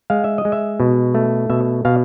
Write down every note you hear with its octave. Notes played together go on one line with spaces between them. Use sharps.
G#3 F5
E5
D#5
G#3
E5
B2
A3
B2 E5
B2 F5